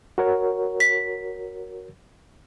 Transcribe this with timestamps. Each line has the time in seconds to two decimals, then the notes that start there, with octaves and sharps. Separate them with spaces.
0.18 F#4 A#4 C#5
0.80 B6